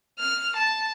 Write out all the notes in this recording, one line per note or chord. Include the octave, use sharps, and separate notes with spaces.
F6
A5